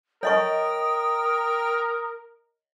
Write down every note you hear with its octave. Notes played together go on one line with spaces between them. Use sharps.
A#4 C#5 D#5 G5 C#6 D#6